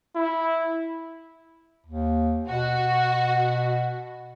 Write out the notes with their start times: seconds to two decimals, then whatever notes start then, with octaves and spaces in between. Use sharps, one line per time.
0.15 E4
1.86 D#2
2.49 B2 F#4